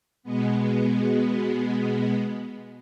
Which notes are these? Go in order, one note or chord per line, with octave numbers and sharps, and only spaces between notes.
B2 G#3 B3